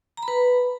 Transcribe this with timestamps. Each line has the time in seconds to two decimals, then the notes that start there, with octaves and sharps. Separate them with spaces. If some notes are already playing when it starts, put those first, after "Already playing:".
0.17 A#5
0.23 B5
0.28 B4